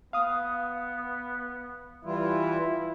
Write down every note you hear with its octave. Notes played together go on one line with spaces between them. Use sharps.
B3 F5 D#6
E3 G3 E4 F4